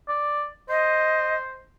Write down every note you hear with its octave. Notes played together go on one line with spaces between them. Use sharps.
D5
C5 D#5